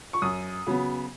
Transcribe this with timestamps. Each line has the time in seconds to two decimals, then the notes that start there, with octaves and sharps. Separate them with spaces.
0.13 C#6
0.22 F#2 D#6
0.67 C#3 F#3 B3